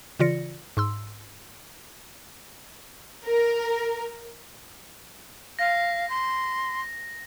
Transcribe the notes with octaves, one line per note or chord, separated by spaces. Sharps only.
C#3 E3 F4 D5 A#6 C#7
G#2 C6 E6
A#4
F5 A#6
C6